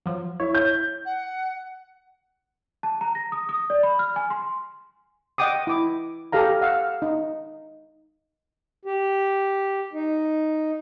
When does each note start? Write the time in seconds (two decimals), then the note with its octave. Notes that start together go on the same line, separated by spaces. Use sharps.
0.06 F3 F#3
0.40 E4 C#5
0.55 G6
1.05 F#5
2.83 A5
3.01 A#5
3.15 A#6
3.32 D#6
3.49 D#6
3.70 D5
3.83 B5
3.99 F6
4.16 G#5
4.30 C6
5.38 D#5 F#5 G5 D6 D#6
5.67 E4 D6
6.32 G4 A4 F5 A#5
6.62 F5 F#5 E6
7.02 D#4
8.85 G4
9.93 D#4